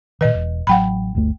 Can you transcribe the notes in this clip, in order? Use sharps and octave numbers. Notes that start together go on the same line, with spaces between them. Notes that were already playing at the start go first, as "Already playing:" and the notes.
A#2 D#3 B4 D#5
E1
A1 F#3 F#5 G5 B5
G1 D2 A3